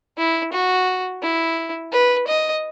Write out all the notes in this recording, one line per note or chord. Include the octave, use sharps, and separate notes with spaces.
E4
F#4
E4
B4
D#5